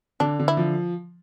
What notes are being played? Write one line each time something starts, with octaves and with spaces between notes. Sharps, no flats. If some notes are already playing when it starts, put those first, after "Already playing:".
D3 D4
D3
E4
F3